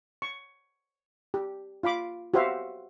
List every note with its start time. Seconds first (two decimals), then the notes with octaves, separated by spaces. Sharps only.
0.22 C#6
1.34 G4
1.83 F4 F5 B5 D6
2.34 F#4 G4 B4 C5 E5 F5